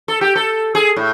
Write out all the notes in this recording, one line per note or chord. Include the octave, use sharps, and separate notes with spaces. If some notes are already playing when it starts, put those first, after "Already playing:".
A4
G4
A4
G#4
A2